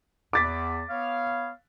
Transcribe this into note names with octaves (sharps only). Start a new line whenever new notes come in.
E2 D6 A6 B6
B3 C#5 F5